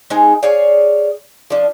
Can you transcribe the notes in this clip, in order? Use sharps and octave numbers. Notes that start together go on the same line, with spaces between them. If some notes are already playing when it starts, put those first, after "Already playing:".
G#3 C4 D#4 G#4
G#4 C#5 D5 F5
F3 D4